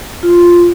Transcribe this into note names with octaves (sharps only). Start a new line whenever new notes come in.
F4